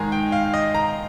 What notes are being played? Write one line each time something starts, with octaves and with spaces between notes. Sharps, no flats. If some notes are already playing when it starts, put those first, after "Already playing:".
Already playing: G#2 D#3 G#3 G#5 A#5
G5
F5
D#5
A#5